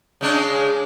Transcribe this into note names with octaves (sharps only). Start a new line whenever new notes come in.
C#3 G#3 D4